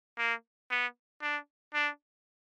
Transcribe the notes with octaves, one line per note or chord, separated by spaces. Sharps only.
A#3
B3
D4
D4